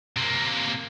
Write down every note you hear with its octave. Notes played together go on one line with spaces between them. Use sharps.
C3 A#3